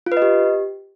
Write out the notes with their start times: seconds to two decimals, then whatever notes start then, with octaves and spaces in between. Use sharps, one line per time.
0.06 F4
0.12 B4
0.17 D#5
0.22 G4